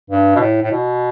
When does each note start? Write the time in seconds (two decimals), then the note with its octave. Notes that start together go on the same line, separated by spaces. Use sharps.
0.10 G2
0.35 B2
0.40 A2
0.62 A2
0.71 B2